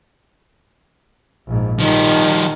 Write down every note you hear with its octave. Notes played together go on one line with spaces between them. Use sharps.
A#1 G#2
D#3 F3 G3